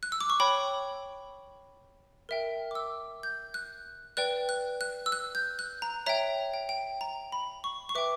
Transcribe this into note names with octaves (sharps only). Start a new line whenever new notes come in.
F#6
E6
D6
C#6
C#5 G5 B5
A#4 E5 G5
D6
E6
G6
F#6
B4 D5 G5 F#6
F#6
F#6
E6
F#6
G6
F#6
A#5
C#5 E5 G5 A#5
G5
G5
A#5
B5
C#6
C#6
B4 E5 G5 D6